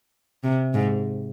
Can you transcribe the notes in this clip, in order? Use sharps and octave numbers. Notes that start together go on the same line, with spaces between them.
C3
G#2